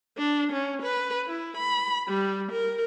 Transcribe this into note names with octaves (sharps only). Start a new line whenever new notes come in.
D4
C#4
B4
E4
B5
G3
A#4